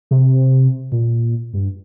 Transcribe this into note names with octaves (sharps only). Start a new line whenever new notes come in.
C3
A#2
G2